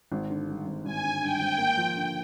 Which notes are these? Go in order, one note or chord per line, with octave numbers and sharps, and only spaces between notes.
G#1
D3
G2
G#1
G#1 G#5
D3
G2 G5
G#1
A#3
F3
D3